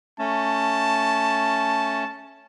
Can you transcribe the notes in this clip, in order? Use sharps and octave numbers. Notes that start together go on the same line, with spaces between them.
A3 C#4 A5